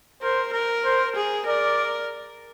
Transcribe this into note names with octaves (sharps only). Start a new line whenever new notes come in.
A#4 C5
A#4
C5
G#4
A#4 D5